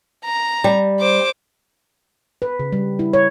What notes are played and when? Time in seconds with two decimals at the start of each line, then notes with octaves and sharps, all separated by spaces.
0.24 A#5
0.64 G3
0.99 C5 D6
2.42 B4
2.60 C#3
2.72 G3
2.99 E4
3.13 C#5